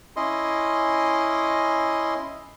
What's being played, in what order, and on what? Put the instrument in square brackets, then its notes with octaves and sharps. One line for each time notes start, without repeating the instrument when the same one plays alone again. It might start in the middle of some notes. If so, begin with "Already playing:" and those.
[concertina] C#4 E4 D#5 C6